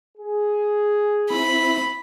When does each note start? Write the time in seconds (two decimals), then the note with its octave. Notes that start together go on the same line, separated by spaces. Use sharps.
0.18 G#4
1.30 C4 E4 B5